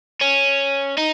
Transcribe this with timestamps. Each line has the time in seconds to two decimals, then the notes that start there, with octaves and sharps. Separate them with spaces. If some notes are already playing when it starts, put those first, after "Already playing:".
0.21 C#4
0.98 D#4